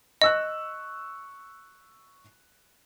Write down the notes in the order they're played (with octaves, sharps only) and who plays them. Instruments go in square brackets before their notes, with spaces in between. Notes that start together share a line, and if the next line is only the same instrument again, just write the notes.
[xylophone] D#5 [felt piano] C#6 E6 F#6